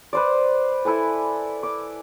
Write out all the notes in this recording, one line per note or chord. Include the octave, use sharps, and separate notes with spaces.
B4 C5 D5
E4 A4 B4 G#5
D6